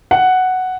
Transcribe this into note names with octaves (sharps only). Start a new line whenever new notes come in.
F#5